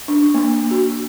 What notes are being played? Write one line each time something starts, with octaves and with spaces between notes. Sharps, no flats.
D4
A#3
F#4